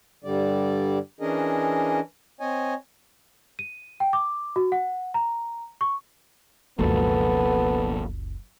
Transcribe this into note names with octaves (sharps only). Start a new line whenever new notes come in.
G2 D3 G3 D5
E3 C#4 D4 G#4 A#4 D#5
C4 C#5 D#5 G#5
D#7
G5
D6
F#4
F#5
A#5
C#6
F#1 C#2 B2 F3 A#3 B3 A4